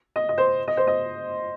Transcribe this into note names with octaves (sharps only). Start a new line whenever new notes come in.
D#5
D#5
C5
D#5
C5
D#5